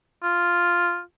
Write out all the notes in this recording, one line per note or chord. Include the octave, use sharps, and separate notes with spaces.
F4